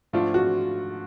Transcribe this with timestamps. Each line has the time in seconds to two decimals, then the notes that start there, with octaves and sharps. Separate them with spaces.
0.13 G#2 F3 A3 D4 F4
0.34 F#4